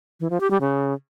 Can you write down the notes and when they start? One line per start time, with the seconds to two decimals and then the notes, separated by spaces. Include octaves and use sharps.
0.20 E3
0.30 F3
0.40 G4
0.51 G3
0.61 C#3